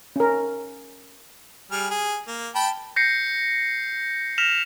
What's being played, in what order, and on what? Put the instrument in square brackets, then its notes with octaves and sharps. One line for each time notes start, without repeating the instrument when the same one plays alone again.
[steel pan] C#4 A#4
[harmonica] G3 G#4 F6
G#4
A#3
G5 A5 B5
[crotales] G6 A#6 C7 C#7
F6 A#6 B6 E7 F7